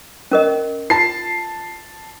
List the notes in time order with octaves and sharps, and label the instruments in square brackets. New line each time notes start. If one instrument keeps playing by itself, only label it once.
[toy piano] C#4 A#4 D#5
[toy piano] F4 [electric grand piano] A5 C7